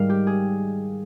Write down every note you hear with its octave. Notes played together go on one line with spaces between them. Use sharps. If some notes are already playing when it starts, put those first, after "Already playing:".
Already playing: G#2 D#3 G3 F5
G4
G#4